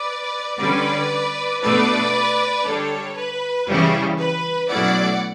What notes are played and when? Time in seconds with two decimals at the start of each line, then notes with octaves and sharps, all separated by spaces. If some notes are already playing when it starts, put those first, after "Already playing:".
Already playing: B4 D5
0.58 D3 G3 C#4 B4 D5
1.61 B2 A3 D4 B4 D5
2.64 D3 G3 D4 A4 C#5
3.15 B4
3.67 C#3 E3 G3 C#4 E4
4.18 B4
4.69 B2 F#3 A3 C#4 E4 D5 F#5